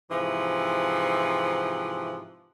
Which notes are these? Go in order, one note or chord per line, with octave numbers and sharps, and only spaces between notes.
G#2 C3 E3 F3